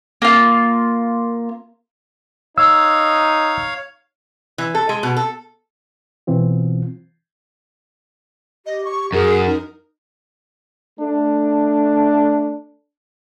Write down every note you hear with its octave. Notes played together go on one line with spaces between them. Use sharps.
A#3 F4
D#4 C#5 F5 E6
E3
A4
G#3
B2
A4
B2 E3 C4 F4
G4 D#5
C#6
F#2 G#4 A#4
D#4
A3 D4